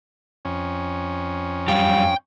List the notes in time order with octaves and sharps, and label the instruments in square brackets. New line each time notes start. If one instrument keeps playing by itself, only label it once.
[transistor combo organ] F2 C#4
[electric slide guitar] F#2 G3 [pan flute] F5 [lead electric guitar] G5